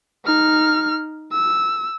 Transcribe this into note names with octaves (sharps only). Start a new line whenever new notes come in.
D#4 F6
E6